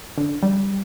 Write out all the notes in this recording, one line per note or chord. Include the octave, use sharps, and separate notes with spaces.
D3
G3